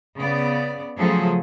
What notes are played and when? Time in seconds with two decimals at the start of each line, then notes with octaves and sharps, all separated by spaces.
0.18 C#3 B3 D5
0.98 C#3 F3 F#3 A3 G#4 A4